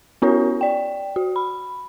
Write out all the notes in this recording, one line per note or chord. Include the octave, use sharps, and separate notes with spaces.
B3 C#4 E4 F#4 A#4 C#5
D5 G5
F#4
B5